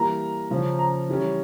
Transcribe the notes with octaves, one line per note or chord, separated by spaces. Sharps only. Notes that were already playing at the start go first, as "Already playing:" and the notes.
Already playing: E3 G3 A#3 A#5
C#3 F3 C#4
A#5
E3 G3 C#4